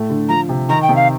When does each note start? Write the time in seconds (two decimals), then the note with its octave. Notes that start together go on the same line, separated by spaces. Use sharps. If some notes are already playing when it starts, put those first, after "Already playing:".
Already playing: A2 A3
0.09 D3
0.29 F3 A#5
0.49 C3
0.69 D#3 A#5
0.83 G5
0.89 C3
0.96 F5